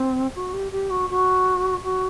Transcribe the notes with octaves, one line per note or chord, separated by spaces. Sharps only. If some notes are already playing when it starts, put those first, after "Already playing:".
Already playing: C4
F#4
G4
G4
F#4
F#4
F#4